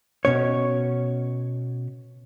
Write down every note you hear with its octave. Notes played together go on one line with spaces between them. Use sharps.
B2 C#4 C#5